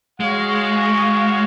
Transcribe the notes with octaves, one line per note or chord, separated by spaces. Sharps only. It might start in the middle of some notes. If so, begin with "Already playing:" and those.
G#3 F#4 C#5 F5